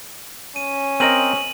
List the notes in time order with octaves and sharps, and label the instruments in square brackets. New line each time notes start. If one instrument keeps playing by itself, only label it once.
[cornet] C#4 [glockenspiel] D#7
[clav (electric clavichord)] C4 A#4 D#5 [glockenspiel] D#7 F#7